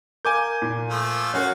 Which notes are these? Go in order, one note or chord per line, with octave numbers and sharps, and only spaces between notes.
A#4 F5 G#5 D6 G6
A#2
F3 A3 F4
F#3 C#4 F#4 A#4 F5 F#5 G#5